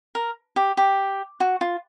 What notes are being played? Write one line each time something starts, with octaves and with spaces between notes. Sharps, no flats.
A#4
G4
G4
F#4
F4